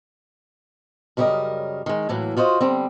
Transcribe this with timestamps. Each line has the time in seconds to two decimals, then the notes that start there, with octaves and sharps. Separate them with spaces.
1.17 F#2 C#3 G3 G4 A#4 D#5
1.86 D#3 G#3
2.09 A2 E3 F#3 A#3
2.37 F4 F#4 C5 D#5
2.60 D3 G3 C4